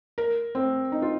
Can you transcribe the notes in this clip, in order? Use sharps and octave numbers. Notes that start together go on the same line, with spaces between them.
A#4
C4
D#4
F4